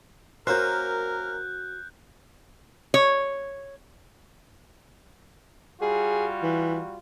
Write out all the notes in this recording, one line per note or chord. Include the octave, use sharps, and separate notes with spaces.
A#3 C#4 F#4 A#4 C5 F#6 G6
C#5
G3 F4 F#4 G#4
E3